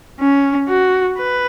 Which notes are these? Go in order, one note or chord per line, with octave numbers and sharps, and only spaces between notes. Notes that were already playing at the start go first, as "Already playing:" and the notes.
C#4
F#4
B4